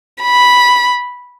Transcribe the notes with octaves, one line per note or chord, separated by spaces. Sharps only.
B5